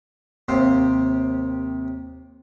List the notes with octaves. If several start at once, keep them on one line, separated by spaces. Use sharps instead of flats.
D#2 C3 C4 C5 F5